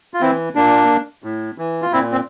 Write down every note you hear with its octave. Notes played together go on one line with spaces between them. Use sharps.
F4
E3 C4 E4
A#2 A#3 D4
A2
E3
F4
A#2 C4 E4
C4